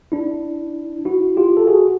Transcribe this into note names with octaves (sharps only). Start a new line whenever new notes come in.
D4 E4
E4 F#4
F4 G4
A4
F#4 G#4